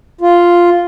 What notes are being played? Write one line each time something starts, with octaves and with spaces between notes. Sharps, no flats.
F4